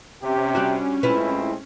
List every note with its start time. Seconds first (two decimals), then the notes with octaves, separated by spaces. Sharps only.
0.23 C3 C#4 G4
0.55 G3 D4 F#4
1.03 A2 G#3 C4 E4 F4 B4